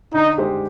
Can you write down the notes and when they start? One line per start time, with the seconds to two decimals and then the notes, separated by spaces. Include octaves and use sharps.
0.13 D3 D#4
0.38 G#3 D#4 G4 C5